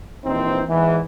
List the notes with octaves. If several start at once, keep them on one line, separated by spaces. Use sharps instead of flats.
A#1 E3 C4 D#4 C5
E2 G#2 E3